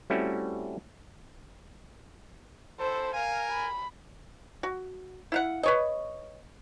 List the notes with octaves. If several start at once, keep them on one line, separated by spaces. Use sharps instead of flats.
G3 A3 C4 C#4 E4 F#4
C4 E4 A4 C5
A#4 F5 G#5
B5
F#4
E4 F5 F#5
B4 C#5 D#5